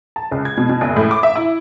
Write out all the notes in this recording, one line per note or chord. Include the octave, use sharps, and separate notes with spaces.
A5
C#2
G#6
B2
B2
F#1
A2
D6
E5
E4